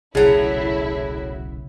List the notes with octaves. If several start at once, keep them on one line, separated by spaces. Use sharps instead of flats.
D#1 B1 A2 C#3 F#3 E4 G#4